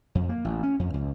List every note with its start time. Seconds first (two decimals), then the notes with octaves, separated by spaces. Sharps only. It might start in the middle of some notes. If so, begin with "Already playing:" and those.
0.15 F2
0.29 A#3
0.45 A1
0.63 C#4
0.79 F2
0.94 C#2